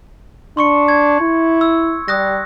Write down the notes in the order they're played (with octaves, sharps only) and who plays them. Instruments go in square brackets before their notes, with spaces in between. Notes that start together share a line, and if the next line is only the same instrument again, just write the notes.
[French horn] D4 [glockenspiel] C6 C#6 C#7
[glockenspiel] G#6
[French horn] E4
[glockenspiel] E6
[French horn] G3 [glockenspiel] D#6 F#6 A#6